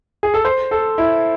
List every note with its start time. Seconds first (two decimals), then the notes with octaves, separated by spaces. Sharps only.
0.23 G#4
0.34 A4
0.45 C5
0.71 A4
0.98 E4